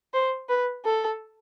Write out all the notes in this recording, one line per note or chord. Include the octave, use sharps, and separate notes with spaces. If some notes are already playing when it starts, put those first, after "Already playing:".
C5
B4
A4